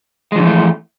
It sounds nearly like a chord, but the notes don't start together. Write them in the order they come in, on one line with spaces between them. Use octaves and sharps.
G#3 F3 D3 E3 A3